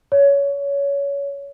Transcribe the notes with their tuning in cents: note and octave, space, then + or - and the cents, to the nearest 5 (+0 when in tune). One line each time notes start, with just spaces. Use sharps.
C#5 +20